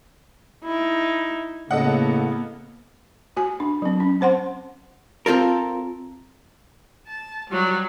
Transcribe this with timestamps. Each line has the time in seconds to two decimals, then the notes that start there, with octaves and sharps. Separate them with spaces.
0.64 D#4 E4
1.71 A2 C#3 A#3 B3 A4 D#5 F#5
3.37 F#4 G#5
3.60 D4
3.82 F#3 C4
4.00 C#4
4.21 C4 C5 F#5 C6
5.26 C4 F4 A4 A#4
7.07 A5
7.50 F#3 G3